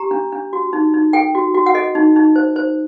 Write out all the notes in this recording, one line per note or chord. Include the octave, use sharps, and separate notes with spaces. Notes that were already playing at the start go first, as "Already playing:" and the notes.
Already playing: G4 A#5
D4
D4
F#4
D#4
D#4
A4 G5
F#4
F#4
F#5
A4 D#5
D#4
D#4
C5
C5